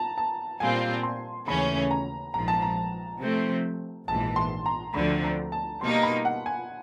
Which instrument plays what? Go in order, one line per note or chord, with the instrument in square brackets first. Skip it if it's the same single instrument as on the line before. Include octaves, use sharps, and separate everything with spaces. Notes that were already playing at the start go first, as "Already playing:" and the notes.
Already playing: [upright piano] A5 A#5
A5
[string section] A#2 G3 C4 F4 [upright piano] G#5
[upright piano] C6
[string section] D#2 C#3 E3 A3 C#4 [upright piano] B5
[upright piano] A#5
[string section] A#1 G#2 F3 [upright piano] A#5
[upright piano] A5
A#5
[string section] C3 F3 A3 C4
[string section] A#1 G#2 E3 [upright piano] A5
[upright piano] C6
A#5
[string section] D2 D3 F3 A3 C4 [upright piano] B5
[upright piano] A#5
A5
[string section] B2 G3 A#3 D#4 [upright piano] C6
[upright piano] B5
F#5
G#5